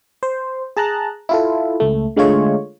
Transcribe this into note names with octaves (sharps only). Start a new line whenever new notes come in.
C5
G#4 A5 A#5 F#6
E4 F4 A4
C#2 A3
D3 G#3 A3 F4 C#5